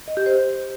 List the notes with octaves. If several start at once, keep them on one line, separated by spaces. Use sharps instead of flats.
D#5
G4
C5